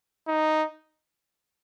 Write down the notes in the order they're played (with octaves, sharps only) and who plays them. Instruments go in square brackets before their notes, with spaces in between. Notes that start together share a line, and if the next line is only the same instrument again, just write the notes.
[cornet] D#4